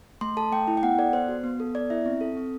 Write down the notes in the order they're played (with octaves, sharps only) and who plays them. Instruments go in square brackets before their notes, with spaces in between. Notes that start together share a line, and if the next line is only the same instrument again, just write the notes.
[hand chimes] A3 C6
A4 A5
A3 G5
E4
G5
B3 F#5
A4 D5
B3 C5
F#4
B3
A4
B3 D5
E4 E5
C4
A4
C4